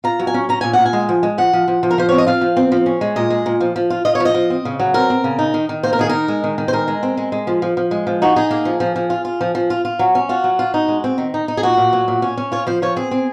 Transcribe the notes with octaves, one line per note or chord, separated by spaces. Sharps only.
F4 A#5
F#3
G#5
C#4
C#4 A#5
A#2 G#5
A#2 F#5
G#5
G#3
F3
G#3
F3 F#5
F3
F3
F3
A#4
F3 C5
C4 C#5
D#5
F4 F5
F3
C4
F3
C#4
G#3
A#2 D#5
G#3
A#2
F3
F3
F4
F4 D#5
C#5
F3
D#5
F3
C4
C#3
F#3
C4 A#4
C4
C#3
D#4
D#3
D#3
A#3 C5
A#4
D#3 G#4
D#4 A#4
G#3
D#3
D#3
C5
G#3 A#4
G#3
C4
G#3
G#3
F3
F3
F3
G#3
F3
D#4 F#4
D#4 G#4
A#3 G#4
F3
F3
F3
F4
F4
F3
F3
F4
F4
F#3
C#4
F4 F#4
F#3
F4
D#4
G#3
C4
D#3
D#4
D#4
G#4
A#2 F#4
A#2
F#3
A#2
C#4
C#4
F4 C#5
F3 C5
F3 C#5
C4 G#4
C4